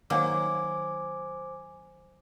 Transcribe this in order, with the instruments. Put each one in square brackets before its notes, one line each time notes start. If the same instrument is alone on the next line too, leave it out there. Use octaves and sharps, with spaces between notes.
[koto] D#3 F#3 A#3 [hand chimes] C5 G#5 D6